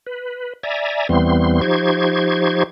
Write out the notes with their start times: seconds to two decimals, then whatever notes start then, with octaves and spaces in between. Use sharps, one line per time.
0.07 B4
0.63 D5 E5 G#5 A#5
1.09 E2 E3 G3 B3 C4 C6
1.61 F3 D#4 G4 C5 C#6 G#6